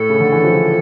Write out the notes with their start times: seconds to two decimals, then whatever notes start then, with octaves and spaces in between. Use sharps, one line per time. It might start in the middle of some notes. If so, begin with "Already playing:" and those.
Already playing: A2 A4
0.09 C#3
0.20 D3
0.32 E3
0.44 F3